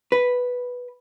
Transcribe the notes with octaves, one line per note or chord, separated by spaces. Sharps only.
B4